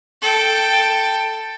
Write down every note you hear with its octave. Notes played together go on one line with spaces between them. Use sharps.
A4 G5